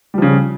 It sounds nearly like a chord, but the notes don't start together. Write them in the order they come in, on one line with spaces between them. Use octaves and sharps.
G3 F3 C#3